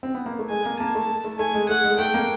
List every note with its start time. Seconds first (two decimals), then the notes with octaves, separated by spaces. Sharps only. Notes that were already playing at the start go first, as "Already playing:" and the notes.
0.03 C4
0.15 B3
0.26 A#3
0.39 A3
0.50 G#3 G#5
0.65 A#3
0.80 A#3 A5
0.95 A3
1.24 A3
1.39 A3 G#5
1.54 G#3
1.69 A3 F#5
1.84 G#3
1.99 A3 G5
2.14 A#3